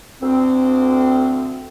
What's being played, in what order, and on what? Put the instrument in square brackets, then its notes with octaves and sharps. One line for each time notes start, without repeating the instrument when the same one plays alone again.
[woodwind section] D2 C4